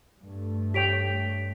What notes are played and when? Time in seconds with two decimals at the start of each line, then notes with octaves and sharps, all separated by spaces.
0.20 G2 A3
0.74 G4 C#5 G5 B6 D7 F7